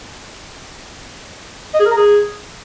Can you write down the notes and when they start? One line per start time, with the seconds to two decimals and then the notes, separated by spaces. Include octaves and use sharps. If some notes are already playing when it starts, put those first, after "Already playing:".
1.74 D#5
1.80 G#4
1.85 A#4
1.91 A#5
1.97 G#4